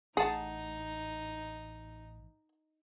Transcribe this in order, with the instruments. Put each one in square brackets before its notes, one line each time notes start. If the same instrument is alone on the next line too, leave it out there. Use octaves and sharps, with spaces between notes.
[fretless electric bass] A1 A2 [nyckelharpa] D#4 [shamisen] G#4 [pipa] F#5 A5